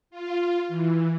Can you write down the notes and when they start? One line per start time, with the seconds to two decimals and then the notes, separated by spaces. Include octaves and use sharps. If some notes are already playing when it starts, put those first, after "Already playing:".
0.10 F4
0.68 E3